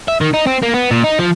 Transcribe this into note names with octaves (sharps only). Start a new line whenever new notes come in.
E5
D#3
D#4
C4
A#3
B3
A#2
D#4
F3